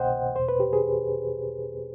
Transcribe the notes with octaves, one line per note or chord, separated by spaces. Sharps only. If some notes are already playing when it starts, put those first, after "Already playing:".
Already playing: C2 B2 C5 D#5 F#5 G5
E2 B2 C5
B4
G4
G#4